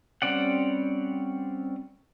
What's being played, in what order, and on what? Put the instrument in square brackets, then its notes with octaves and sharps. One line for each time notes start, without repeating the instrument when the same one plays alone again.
[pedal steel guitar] G3 C4 C#4 D5 F#5